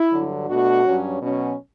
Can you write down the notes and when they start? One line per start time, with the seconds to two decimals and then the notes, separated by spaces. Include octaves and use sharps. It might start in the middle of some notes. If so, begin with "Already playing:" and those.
Already playing: E4
0.11 G2 D3 F#3
0.47 B2 A3 D4 F#4
0.84 G2 F#3 C#4
1.21 B2 F#3 C#4